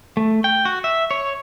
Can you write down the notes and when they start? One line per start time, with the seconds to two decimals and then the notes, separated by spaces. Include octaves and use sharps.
0.17 A3
0.44 G5
0.65 F#4
0.84 E5
1.11 C#5